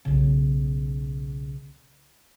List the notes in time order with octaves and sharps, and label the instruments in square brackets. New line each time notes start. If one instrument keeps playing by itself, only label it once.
[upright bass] B1 C#3